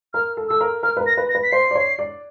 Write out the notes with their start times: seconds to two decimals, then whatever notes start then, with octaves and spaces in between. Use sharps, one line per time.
0.14 A#4 F6
0.37 A4
0.49 A4 E6
0.61 A#4
0.83 A#4 F6
0.97 B4
1.00 A#4
1.06 A#6
1.17 B4
1.29 A#6
1.35 B4
1.43 B6
1.52 C5 C7
1.71 D5
1.75 C#5
1.99 D5